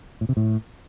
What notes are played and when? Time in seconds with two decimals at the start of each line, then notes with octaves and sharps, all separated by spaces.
0.21 A2
0.29 C3
0.37 A2